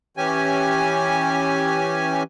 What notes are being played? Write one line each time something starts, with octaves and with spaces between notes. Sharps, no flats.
E3 C#4 G4 G#5